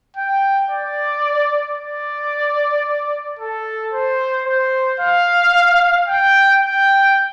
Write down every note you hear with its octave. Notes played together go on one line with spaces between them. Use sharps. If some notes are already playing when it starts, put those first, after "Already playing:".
G5
D5
D5
A4
C5
C5
F5
G5
G5